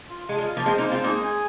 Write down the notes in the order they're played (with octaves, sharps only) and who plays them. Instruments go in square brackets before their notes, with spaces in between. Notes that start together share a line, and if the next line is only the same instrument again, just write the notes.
[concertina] F4
[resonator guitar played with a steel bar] G#3 [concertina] F4
[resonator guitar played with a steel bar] G#3
[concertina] F5
[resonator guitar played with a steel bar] F3 A#3
[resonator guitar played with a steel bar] G#3 C4 [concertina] C5
[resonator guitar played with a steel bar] A#3 D#4
[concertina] G#3
[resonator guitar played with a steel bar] C4 F4
[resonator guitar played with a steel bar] A#3 D#4 [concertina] G#4
[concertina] G#5